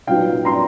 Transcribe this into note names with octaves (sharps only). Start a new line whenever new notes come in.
A#2 F#3 B3 D#4 F5 G5
A#5 C6